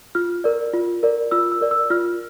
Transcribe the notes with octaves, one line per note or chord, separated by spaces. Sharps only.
F4 F6
A#4 D5
F4
A#4 D5
F4 E6
E6
A#4 D5
E6
F4 F6